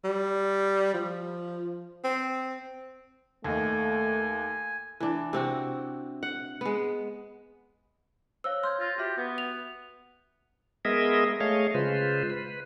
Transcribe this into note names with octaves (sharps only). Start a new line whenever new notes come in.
G3
F3
C4
D#2 A3 D#5 G#5
E3 D4
C3 C4 F#4
F#5
G#3 B3
C5 C#5 F5 E6
C6 F6 G6 G#6
F4 G6 A#6
F#4 G4 E5
B3
F7
G#3 B3 G#4 A#4 D#5 E5
A3 G#4 C#5 D#5 F5
C#3 G#3 F4 B4 C5
B4